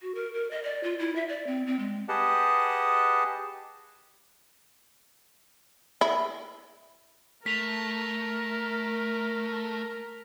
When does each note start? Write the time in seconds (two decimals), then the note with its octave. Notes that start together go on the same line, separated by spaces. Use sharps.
0.01 F#4
0.15 A#4
0.34 A#4
0.51 D#5
0.63 D5
0.83 F4
0.99 E4
1.15 E5
1.28 D5
1.47 C4
1.66 C4
1.79 G#3
2.09 G4 G#4 B4 D#5 F#5 A5
6.01 E4
7.46 A3 A#4 B6 F7